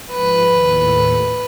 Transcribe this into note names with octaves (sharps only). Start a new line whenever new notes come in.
G#2 F3 B4
D#2 A2 A4